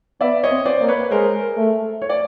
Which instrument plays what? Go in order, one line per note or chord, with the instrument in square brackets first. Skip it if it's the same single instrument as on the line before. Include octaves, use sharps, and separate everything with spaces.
[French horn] B3 [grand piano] D5 E5
[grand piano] C#5 D#5
[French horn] C4
[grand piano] C5 D5
[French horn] A#3
[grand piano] B4 C#5
[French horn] G#3 [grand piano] A#4 C5
[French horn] A3
[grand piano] C#5
D5